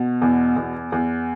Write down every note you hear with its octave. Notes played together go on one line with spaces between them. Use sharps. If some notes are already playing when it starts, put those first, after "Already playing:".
Already playing: B2
E2
E2
E2